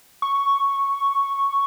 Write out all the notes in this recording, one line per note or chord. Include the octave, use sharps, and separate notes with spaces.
C#6